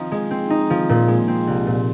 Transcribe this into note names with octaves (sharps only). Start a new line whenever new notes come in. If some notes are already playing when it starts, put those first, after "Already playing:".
Already playing: F3 C4 D#4
G#3
C4
D#4
F3
A#2
G#3
C4
C2
A#2